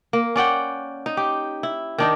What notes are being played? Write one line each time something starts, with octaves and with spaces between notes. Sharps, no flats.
A#3
C#4 D5 F#5 G5
D#4
G4
E4
D#3 D4 D#4